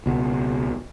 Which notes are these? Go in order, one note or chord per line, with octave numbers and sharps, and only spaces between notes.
C#2 B2